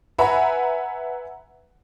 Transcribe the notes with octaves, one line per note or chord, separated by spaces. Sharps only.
B4 E5 F#5 G#5 A#5 B5